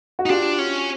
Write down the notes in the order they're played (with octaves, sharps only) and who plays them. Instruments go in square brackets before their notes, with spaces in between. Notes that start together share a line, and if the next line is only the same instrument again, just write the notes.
[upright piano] F#4
[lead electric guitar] D#4
[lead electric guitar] D4 [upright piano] F4 G4
[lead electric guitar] C#4